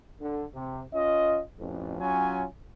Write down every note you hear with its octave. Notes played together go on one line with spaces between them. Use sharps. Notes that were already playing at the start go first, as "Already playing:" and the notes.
D3
C3
C#4 F4 D#5
A1 F2
F#3 C#4 F4 G#5